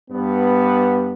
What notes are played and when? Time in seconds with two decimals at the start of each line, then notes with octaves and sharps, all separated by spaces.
0.11 G2 B3